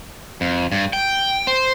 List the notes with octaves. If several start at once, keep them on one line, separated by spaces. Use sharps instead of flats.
F2
G2
G5
C5